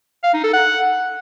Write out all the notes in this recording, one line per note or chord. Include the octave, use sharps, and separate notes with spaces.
F5
D#4
A4
F#5